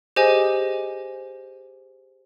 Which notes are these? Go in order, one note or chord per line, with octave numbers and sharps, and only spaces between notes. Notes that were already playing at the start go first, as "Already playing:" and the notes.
G4 G#4 C5 D#5 G#5